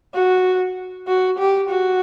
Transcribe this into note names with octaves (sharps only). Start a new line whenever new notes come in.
F#4
F#4
G4
F#4